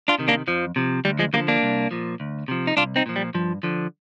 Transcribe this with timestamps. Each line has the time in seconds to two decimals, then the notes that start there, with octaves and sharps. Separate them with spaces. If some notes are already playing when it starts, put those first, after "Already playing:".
0.08 D4 F4
0.19 C3 D#3
0.28 A#3 D4
0.47 F2 F3
0.76 C3 F3
1.05 D2 G3
1.19 F3 G#3
1.33 D3 G3 A#3
1.37 F3
1.48 A#3 D4
1.63 C2
1.91 A#2 F3
2.20 D2
2.48 C3 F3
2.67 D#4
2.77 C2 D4 F4
2.96 C4 D#4
3.06 A#2 F3
3.16 G3
3.34 G2 F3
3.63 D3 F3